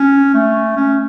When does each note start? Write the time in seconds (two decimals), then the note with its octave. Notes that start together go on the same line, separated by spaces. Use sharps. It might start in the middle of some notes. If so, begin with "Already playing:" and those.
Already playing: C#4
0.34 A3
0.76 C#4